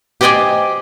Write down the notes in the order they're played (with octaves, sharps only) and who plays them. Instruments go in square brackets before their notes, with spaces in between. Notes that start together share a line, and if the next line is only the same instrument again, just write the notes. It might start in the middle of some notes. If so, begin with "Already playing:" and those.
[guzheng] G4 C5 D5 D#5 G5 G#5